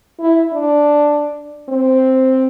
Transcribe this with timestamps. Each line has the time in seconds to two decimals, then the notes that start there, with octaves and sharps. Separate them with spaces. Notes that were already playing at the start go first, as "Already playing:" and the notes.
0.20 E4
0.53 D4
1.69 C4